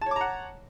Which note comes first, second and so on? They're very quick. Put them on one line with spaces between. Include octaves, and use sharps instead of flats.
A5 C#5 D6 A#5 F#5